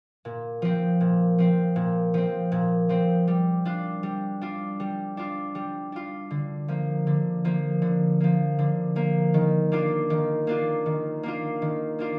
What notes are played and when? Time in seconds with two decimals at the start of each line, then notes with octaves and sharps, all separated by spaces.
0.25 A#2
0.62 F3 C4
1.01 A#2
1.38 F3 C4
1.76 A#2
2.14 F3 C4
2.52 A#2
2.89 F3 C4
3.28 G3
3.65 D4 F4
4.03 G3
4.41 D4 F4
4.80 G3
5.17 D4 F4
5.55 G3
5.92 D4 F4
6.31 D3
6.68 F3 A#3
7.07 D3
7.45 F3 A#3
7.82 D3
8.20 F3 A#3
8.59 D3
8.96 F3 A#3
9.34 D#3
9.72 A#3 D4 F4
10.10 D#3
10.47 A#3 D4 F4
10.86 D#3
11.23 A#3 D4 F4
11.62 D#3
11.99 A#3 D4 F4